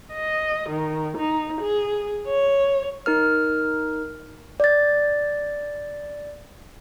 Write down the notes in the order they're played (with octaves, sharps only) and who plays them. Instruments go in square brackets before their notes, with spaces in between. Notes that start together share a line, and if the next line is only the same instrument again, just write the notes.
[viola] D#5
D#3
D#4
G#4
C#5
[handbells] D#4 A#4 F6
[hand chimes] D5 A6